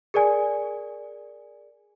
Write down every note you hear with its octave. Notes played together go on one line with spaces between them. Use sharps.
G#4 A#4 D5 G#5